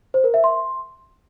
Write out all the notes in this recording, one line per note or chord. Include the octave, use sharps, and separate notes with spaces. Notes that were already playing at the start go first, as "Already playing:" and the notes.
C5
A#4
E5
C6